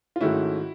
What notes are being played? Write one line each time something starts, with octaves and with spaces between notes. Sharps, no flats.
F4
G#2 D#3 F#3 A3 C#4 E4 F#4